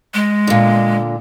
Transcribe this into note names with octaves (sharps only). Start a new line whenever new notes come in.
G#3
A#2 D3